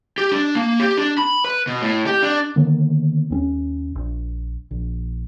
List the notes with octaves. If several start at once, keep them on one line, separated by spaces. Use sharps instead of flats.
G4
D4
A#3
G4
D4
B5
B4
B2
A2
G4
D4
D3 D#3 A#3 B3
D#2 C4 C#4
A#1
A#1